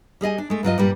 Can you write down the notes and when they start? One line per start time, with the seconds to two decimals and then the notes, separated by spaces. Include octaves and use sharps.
0.21 G3 G#4 D#5 G#5
0.38 D4
0.50 G#3 A3
0.63 G2 F#3 F4 D#5
0.78 G2 A#2 G3